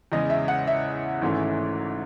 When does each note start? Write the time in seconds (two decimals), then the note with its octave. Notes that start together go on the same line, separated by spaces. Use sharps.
0.12 E2 C#3 G#3 C#4 D#5
0.30 E5
0.48 F#5
0.67 E5
1.21 G#1 G#2 E3 A3 C#4